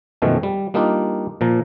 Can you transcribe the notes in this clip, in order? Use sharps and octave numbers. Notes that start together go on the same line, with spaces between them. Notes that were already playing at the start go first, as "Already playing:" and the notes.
F#2 B2 D#3 F3 G#3 A3
G3
G3 A#3 D4 D#4 F4
A#2 F3 A#5